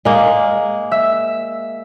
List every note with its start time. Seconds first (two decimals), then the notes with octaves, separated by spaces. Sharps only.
0.05 G#3 A#3
0.91 E5 E6